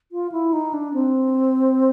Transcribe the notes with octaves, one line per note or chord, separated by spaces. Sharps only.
F4
E4
D#4
D4
C4